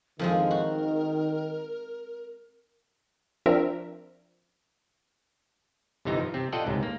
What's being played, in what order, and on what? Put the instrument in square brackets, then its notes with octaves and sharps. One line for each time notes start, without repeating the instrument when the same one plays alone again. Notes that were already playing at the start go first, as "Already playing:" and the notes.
[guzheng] F2 F3 G#3 [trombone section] D#3 [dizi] A#4
[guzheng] F#4
[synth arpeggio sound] F3 C4 D4 A#4 E5
[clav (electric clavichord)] G1 C3 E3 D#4 A#5
F3
C3 C4
F4 A4 D5 D#5 F#5 G5
C#2 G#2 C3
A#3